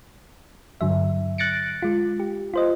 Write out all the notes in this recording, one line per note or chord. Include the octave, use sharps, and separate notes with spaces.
G2 D3 F#3 E5
F#6 A6 A#6 C#7 D7
G#3 F4
G4
F4 C5 D#5